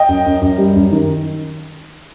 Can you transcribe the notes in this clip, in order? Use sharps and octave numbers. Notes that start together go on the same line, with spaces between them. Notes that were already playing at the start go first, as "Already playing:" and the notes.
Already playing: D#5 G5
F#2
F#2
F#2
G3
F#2
D#3